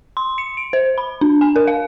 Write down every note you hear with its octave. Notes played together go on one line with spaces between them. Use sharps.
C6
C#7
D7
C5
B5
D4
G#5
A#4
F5